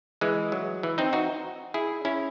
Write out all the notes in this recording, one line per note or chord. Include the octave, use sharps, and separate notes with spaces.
E3 G#3
F#3
E3
C4 D#4
D#4 F#4
E4 G#4
C#4 E4